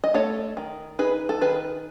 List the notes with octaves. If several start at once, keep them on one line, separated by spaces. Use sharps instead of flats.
D#5
A3 A4 C#5
D#3
D#4 G#4 B4
A4
D#3 G#4 B4